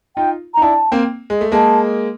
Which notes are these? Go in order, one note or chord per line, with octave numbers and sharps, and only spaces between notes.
D#4 F4 G5
A#5
D#4
D4 E4 A5
A#3 C4
G#3
A3
G#3 A#3 A5